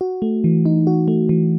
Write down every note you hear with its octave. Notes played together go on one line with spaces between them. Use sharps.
F#4
A3
E3
D#4
F#4
A3
E3